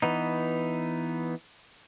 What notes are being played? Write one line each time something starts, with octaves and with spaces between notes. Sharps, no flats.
E3 B3 D#4